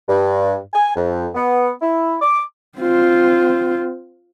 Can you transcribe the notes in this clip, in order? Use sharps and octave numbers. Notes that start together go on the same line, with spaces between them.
G2
G#5
F2
B3
E4
D6
C4 F4